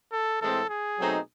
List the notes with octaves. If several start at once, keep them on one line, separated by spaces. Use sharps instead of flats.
A4
A2 E3 G#3 C4 A4
G#4
B2 F#3 A3 C4 D#4